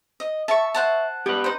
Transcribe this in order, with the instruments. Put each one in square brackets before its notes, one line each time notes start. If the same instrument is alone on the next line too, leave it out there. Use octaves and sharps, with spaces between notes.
[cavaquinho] D#5
[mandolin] E5 C#6 [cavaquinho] A5
[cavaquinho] C5 F#5 A5
[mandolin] B3 [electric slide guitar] G4 B4
[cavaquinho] D#4 C5